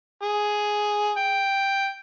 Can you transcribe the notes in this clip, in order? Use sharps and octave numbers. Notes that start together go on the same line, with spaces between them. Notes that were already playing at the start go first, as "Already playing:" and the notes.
G#4
G5